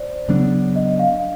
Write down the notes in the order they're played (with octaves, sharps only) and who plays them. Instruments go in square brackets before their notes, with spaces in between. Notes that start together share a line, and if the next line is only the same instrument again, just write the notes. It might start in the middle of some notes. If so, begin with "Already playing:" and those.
Already playing: [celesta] C5 D5
[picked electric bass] C#3 F#3 B3 D4
[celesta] D#5
F5